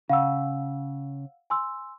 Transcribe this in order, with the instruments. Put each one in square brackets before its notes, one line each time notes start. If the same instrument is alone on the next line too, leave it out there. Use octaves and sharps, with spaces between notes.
[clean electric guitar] C#3 [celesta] F5 F#5 E6
[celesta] G#5 C6 E6